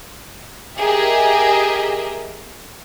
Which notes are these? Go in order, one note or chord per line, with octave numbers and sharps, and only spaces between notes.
G4 G#4 A#4 D#5 E5